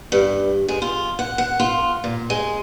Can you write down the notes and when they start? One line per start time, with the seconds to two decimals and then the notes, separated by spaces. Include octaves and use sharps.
0.12 G2
0.68 G#3
0.82 F4
1.19 F#5
1.38 F#5
1.60 F4
2.04 A#2
2.30 G#3